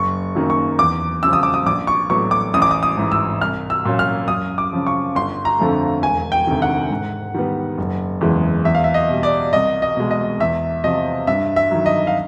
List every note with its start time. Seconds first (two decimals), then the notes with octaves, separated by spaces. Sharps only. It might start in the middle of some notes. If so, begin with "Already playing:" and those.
Already playing: F#1 C#6
0.35 F#2 D#3 F#3 A#3
0.50 C#6
0.78 E2 D6
1.23 C#3 F3 E6
1.33 D#6
1.43 D6
1.54 D#6
1.66 A#1 D6
1.87 C#6
2.10 A2 F#3 B3 C#6
2.31 D6
2.54 A1 D#6
2.62 D6
2.71 D#6
2.83 D#6
2.97 G#2 E3
3.12 E6
3.41 C2 F6
3.70 E6
3.85 A#2 F#3 A#3 C#4
3.99 F6
4.28 F#2 D#6
4.58 D6
4.73 C#3 F3
4.87 C#6
5.15 G1 C6
5.45 A#5
5.59 F2 D3 F3 A3
6.03 E1 G#5
6.32 G5
6.47 D2 C3 D#3
6.62 F#5
6.91 G#2
7.34 D#3 G3 B3
7.78 F#1
8.21 E2 C#3 E3 G#3
8.65 E2 E5
8.75 F5
8.84 E5
8.94 D#5
9.09 B2 G3
9.23 D5
9.53 C2 D#5
9.82 D#5
9.97 B2 G#3
10.11 D#5
10.40 E2 E5
10.84 C3 F3 D#5
11.27 G2 E5
11.56 E5
11.71 D#3 F#3
11.86 D#5
12.07 F5